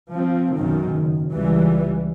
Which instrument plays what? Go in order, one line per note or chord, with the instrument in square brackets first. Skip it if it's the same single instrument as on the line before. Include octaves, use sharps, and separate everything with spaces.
[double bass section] F3 C4
B1 F#2 D#3
F#1
C#2 E3 G3